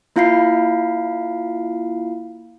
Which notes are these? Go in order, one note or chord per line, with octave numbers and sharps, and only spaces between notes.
A#3 E4 F4 F5 B5 C7